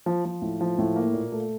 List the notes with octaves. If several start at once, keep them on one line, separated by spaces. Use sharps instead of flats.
F3
F3
A2
F3
A2
A#3
A#2
A3